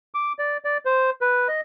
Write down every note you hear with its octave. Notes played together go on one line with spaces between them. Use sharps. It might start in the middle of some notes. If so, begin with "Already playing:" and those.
D6
D5
D5
C5
B4
D#5